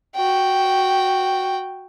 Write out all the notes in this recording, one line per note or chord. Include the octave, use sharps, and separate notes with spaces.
F#4 G5